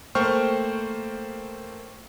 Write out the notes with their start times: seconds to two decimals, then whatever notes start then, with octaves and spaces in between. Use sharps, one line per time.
0.15 A3 A#3 C5 G5 C#6 F6